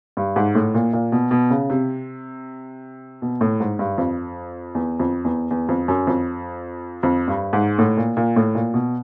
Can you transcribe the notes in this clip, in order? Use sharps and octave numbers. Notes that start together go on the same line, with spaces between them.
G2
G#2
A2
A#2
A#2
B2
B2
C#3
C3
B2
A2
G#2
G2
F2
E2
F2
E2
E2
F2
F#2
F2
F2
G2
G#2
A2
A#2
A#2
A2
A#2
B2